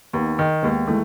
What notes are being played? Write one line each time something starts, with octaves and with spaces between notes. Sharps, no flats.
D#2 B3 D#4
D#3
D#2 G#3 B3
E3 G#3 A3